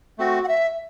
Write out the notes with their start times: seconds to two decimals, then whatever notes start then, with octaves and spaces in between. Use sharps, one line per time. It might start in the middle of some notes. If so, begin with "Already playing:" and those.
0.18 A3 C4 F#4
0.44 F#5
0.48 E5